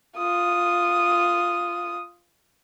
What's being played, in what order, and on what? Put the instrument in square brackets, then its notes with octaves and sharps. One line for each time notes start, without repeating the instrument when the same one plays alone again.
[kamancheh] F4 D#6